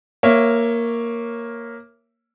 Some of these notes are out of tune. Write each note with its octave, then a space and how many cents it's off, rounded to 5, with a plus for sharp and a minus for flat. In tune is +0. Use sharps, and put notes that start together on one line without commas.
A#3 +0 C#5 -10 E5 +20